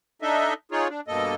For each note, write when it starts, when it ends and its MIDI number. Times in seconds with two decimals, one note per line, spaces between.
0.22 0.54 62
0.22 0.54 63
0.22 0.54 69
0.22 0.54 75
0.22 0.54 76
0.72 0.88 63
0.72 0.88 65
0.72 0.88 68
0.72 0.88 73
0.89 1.01 62
1.08 1.35 43
1.08 1.35 47
1.08 1.35 58
1.08 1.35 69
1.08 1.35 75